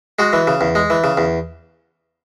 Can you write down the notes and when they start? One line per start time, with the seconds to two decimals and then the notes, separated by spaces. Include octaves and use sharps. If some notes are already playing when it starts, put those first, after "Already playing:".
0.19 G#3 F#4
0.33 E3
0.47 C#3
0.61 E2
0.75 G#3
0.90 E3
1.04 C#3
1.17 E2